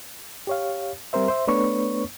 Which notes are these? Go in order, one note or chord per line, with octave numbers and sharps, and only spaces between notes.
G4 C#5 F5
G3 C4 A#4 C5 E5
C5 E5
A3 B3 D4 B4 C#5 C#6